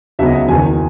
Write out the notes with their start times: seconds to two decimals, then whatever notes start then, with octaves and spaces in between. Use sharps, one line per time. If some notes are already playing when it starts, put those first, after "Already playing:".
0.19 C#2 C#3 F#3 B3 D#4 E5
0.26 D#5
0.34 E5
0.48 F#1 E2 D#3 G#5